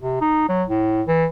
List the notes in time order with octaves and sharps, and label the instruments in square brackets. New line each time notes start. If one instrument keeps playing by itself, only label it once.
[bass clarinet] C3
D#4
F#3
A2
E3